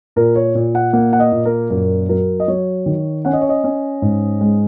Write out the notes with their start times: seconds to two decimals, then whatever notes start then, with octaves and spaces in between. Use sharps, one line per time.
0.16 A#2 A#4
0.36 C#5
0.55 A#2
0.75 F#5
0.93 A#3 F#5
1.13 F#5
1.20 D#5
1.32 A#2
1.45 A#4
1.70 F#2 A#4
2.09 F#3 A#4
2.40 D#5
2.48 F#3 C#5
2.86 D#3
3.25 C#4 F#5
3.33 D#5
3.41 C#5
3.49 D#5
3.64 C#4
4.02 G#2
4.41 G#3